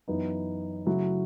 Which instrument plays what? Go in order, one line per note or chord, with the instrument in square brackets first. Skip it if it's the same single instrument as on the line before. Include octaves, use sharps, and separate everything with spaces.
[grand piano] F#2 E3 B3 D#4
C#3 F#3 A3 E4